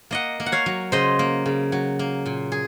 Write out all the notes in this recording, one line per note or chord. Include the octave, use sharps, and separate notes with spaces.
A#3 D#5 F#5
A#3
F#5
C#5 F5
F#3
C#3 C5 D#5
A#3
C#3
F#3
A#3
A#2
G#4